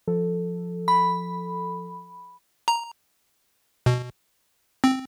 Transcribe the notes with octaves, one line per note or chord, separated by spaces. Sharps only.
F3 A4
B5
A#5
B2
C4